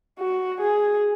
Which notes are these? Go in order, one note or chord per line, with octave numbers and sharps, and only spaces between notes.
F#4
G#4